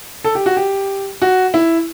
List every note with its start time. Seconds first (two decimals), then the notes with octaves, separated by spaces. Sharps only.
0.24 A4
0.35 G4
0.46 F#4
0.57 G4
1.22 F#4
1.54 E4